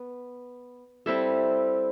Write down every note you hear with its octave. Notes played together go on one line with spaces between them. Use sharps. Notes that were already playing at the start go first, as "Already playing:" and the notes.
Already playing: B3
G3 C4 E4 A4